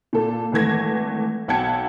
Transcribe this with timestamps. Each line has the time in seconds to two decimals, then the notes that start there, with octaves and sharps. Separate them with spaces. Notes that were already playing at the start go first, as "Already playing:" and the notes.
0.13 A#2 A4
0.52 G#1 E3 A3 G#6 A#6
1.48 B1 F#5 G5 A5 G#6 C#7